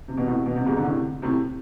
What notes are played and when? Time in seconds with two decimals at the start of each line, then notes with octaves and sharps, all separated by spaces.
0.08 C3
0.17 B2
0.28 A2 C3
0.46 B2
0.56 C3
0.66 G#2 B2
0.77 D3
0.84 A2 C3
1.22 A2 C3